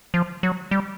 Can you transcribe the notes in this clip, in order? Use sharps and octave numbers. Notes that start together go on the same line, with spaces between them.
F3
F#3
G3